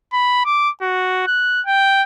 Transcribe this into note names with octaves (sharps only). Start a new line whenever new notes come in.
B5
D6
F#4
F#6
G5